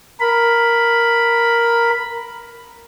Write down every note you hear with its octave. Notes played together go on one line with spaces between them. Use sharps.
A#4 B5